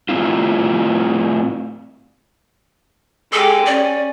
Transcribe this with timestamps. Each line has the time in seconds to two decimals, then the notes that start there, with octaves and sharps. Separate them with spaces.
0.09 A2 C4 E4 F4
3.33 G#3 G4 A4
3.66 C#4 D5